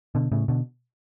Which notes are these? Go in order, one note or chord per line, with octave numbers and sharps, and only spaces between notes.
B2 D3
A2 C#3
B2 D3